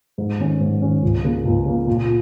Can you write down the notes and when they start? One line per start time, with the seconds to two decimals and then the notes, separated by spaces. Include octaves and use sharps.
0.18 G#2
0.40 D#3 C#4
0.61 G#2
0.82 D#3 C#4
1.02 C#2
1.24 C#3 A#3
1.45 C#2
1.66 C#3 A#3
1.87 A#2